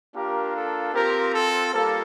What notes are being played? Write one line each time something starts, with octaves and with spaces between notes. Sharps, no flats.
A#3 D4 F4 G4 A#4
A4
C4 F4 G4 A#4
A4
G3 A#3 F4 A4